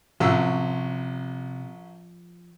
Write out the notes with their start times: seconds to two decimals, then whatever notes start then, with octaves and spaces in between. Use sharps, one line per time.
0.20 A1 C3 F3 F#3 E6